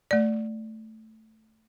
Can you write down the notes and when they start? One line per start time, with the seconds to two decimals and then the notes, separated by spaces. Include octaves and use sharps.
0.11 A3 D5